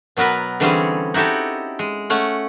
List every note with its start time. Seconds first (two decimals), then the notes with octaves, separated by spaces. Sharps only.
0.17 B2 F#3 B3 A#4 B4
0.60 D3 E3 G3 C4 C#4 G#4
1.14 D#4 E4 F#4 G4 A4
1.79 G#3
2.10 A3 C#4 F#5